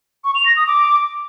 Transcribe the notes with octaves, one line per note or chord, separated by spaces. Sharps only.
C#6
F7
A#6
D#6
D6